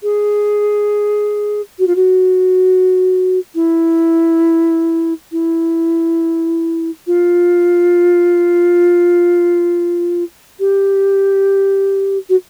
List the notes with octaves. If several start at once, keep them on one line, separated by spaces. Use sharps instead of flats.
G#4
F#4
F4
F#4
E4
E4
F4
G4
F#4